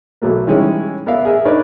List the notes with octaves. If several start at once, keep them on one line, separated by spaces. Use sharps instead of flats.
B1 F#3 A3 A#3
E3 G3 G#3 C#4 D#4
B3 A#4 D5 E5 F5
G#4 A#4 E5
D4 D#4 A#4 B4 C#5 D5